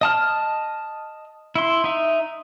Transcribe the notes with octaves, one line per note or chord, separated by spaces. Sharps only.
D#5 A5 F6
E4 C6
D#4 E5